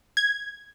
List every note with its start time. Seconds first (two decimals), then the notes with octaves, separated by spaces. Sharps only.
0.17 G#6